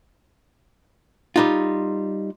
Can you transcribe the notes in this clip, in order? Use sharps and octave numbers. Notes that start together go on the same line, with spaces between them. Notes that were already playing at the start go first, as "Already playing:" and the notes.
G3 D#4 F4